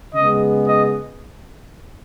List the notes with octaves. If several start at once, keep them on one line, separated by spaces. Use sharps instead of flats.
C#3 G#3 B3 D#5
D#5